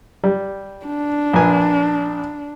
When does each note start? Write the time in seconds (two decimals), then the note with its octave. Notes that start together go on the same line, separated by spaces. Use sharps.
0.24 G3
0.85 D4
1.33 A#1 B4 G#5